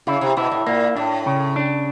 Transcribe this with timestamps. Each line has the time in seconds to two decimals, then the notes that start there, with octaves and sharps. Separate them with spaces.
0.07 C#3 E4
0.21 C3
0.37 B2 E4
0.52 A2
0.67 A#2 A#3
0.96 A2 D4
1.26 C#3
1.56 D4